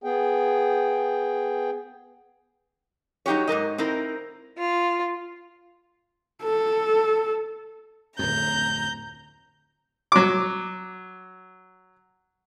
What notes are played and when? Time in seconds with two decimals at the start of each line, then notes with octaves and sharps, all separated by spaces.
0.04 B3 G#4 G5
3.26 F#3 D#4 F#4 G4 C#5
3.47 G#2 B2 A#4 D#5
3.78 C4 D#4 E4 A#4
4.59 F4
6.43 A4
8.19 D1 F2 A#5 G6
10.12 F#3 D6